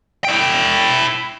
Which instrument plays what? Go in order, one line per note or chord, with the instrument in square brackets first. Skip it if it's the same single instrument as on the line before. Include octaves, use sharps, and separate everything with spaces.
[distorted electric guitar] E4 G5